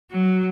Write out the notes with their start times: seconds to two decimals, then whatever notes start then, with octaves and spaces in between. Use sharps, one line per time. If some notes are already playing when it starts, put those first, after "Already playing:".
0.12 F#3